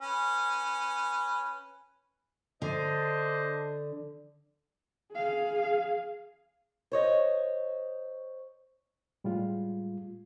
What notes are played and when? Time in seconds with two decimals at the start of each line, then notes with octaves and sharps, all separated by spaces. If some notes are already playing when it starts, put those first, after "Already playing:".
0.01 C#4 B4
2.62 D3 D4 C5 D#5
5.12 G#4 F5
6.92 C5 C#5 D#5
9.24 A2 G3 G#3 F4